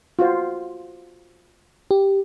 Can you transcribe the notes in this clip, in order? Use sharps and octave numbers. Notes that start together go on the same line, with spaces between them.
F4 F#4 C5
G4